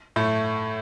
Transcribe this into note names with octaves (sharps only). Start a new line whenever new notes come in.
A2 A3